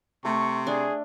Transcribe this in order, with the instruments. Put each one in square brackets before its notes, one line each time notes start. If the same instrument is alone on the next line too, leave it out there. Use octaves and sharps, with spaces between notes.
[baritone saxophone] C3 [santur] A3 [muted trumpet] C#6
[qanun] D4 [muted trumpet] G#4